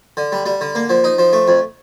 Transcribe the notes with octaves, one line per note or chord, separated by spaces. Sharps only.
D3
G3
G3
D3
A#3
F3
D#4
F3
A3
F2